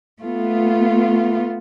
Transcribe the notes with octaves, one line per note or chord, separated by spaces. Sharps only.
A3 B3 F4